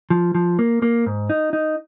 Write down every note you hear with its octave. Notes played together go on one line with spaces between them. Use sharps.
F3
F3
A#3
A#3
G#2
D#4
D#4